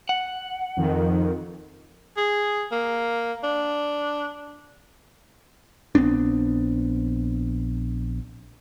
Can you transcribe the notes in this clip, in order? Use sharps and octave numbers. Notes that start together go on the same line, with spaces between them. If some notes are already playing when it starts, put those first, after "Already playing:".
F#5
F2 D#3
G#4
A#3
D4
A#1 B3 C4 D4